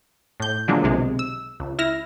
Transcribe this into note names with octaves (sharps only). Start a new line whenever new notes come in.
A2 G6
D3 F3 F#3 G#3 A#3
B1 C3 G#3
E6
C#2
E4 F6 A#6